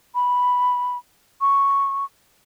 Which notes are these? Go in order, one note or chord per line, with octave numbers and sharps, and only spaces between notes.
B5
C#6